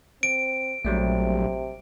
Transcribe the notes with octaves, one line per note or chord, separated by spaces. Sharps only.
C4 D7
A#1 C3 F#3 G3 A3